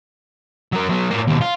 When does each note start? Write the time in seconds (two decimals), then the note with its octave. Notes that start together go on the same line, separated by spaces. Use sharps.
0.73 F#3 A#4
0.90 F#3 B3
1.11 A2 A#3
1.27 D#2 B2
1.41 F4